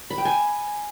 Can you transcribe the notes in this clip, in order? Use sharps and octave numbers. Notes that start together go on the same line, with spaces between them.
B5
G5
G#5